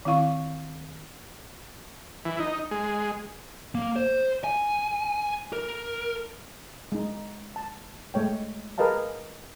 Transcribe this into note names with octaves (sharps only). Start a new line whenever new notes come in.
D#3 C4 E4 F5 C#6
E3
D#4
G#3
A#3
C5
G#5
A#4
G#3 D#4
A5
G#3 A3 C#5 G5
G#4 A#4 B4 D#5 F5 A5